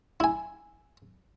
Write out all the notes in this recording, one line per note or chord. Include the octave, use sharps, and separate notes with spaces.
E4 G#5